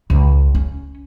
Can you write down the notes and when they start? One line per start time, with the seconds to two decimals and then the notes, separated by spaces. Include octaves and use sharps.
0.10 C#2
0.55 C#4